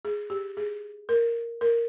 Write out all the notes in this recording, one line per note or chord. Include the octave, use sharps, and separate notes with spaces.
G#4
G4
G#4
A#4
A#4